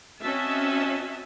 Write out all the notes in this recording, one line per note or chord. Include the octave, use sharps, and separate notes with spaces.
C4 C#4 F#4 D#5 E5 A5